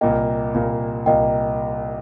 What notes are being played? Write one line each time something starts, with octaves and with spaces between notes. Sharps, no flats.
C2 A#2 A#3 D#5 G5
C2 A#2 A#3
C2 A#2 A#3 D#5 G5